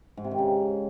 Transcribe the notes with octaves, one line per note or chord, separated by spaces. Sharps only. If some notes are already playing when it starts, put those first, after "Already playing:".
G#2
C3
D#3
C#3